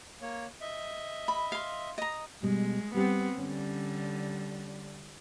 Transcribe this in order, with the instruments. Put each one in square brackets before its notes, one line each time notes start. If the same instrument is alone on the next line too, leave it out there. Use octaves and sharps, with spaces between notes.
[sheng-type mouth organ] A#3 C#5
D#5 E5
[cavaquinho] B5
F5 C6
D#5 A#5
[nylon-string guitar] B2 G3 [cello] G#3
[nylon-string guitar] G3 G4 [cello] B3 C4
[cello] D3 G3 [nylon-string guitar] C#4